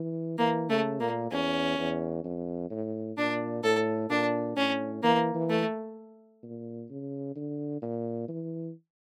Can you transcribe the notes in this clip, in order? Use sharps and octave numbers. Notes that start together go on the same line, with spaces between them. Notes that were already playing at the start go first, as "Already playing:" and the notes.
Already playing: E3
E3 A#3
C#3 A3
A#2 A#3
E2 C#4
E2
F2
A2
A#2 D4
A2 A4
A#2 D4
A2 C#4
E3 A#3
E3
A3
A#2
C#3
D3
A#2
E3